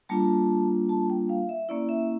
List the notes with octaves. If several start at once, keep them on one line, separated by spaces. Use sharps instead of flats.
G3 A#3 D4 F4 A5
A5
G5
F5
E5
A#3 C#4 E4 D5
E5